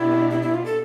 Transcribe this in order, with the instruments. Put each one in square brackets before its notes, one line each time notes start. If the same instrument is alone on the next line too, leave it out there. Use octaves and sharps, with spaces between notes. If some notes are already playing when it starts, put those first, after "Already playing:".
Already playing: [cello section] B2 B3 D4 G4 [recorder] E4
[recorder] E4
E4
F4
A4